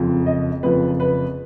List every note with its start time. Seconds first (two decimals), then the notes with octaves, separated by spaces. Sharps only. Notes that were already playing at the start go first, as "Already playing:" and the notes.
Already playing: F#1 F2 F3
0.26 D#5
0.63 F#1 F2 F3 B4
1.00 B4